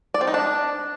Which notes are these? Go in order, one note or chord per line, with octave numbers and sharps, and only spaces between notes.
D5
C4
D#4
D4